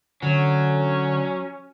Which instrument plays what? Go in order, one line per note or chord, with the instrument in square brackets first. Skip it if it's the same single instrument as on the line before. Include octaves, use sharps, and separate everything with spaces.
[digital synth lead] D3 [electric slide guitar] F#3 [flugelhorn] C#4